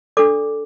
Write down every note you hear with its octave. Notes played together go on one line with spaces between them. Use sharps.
D4 A4 D5 D6